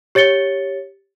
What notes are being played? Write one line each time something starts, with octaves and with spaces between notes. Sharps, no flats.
G4 C#5 A6 C#7 G7